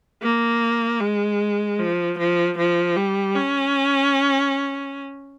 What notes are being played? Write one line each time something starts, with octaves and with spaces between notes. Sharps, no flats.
A#3
G#3
F3
F3
F3
G3
C#4